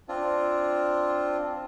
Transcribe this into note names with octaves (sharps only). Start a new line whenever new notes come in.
C4 D4 F4